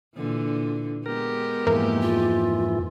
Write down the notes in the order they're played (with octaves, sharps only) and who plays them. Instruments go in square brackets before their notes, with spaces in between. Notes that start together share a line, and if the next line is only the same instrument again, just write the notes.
[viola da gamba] A#2 D3 E3
[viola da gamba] G#3 B3 G4 [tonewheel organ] A#4
[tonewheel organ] F2 G#2 E3 [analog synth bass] A#3
[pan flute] F4